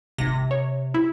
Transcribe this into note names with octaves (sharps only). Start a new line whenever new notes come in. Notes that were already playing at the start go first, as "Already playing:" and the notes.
G#1 C3 A#6
C#5
E4